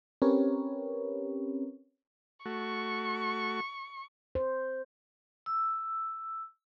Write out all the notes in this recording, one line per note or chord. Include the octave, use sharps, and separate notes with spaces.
C4 C#4 G4 A#4 B4 C#5
A3 F#4 C#6
C5
E6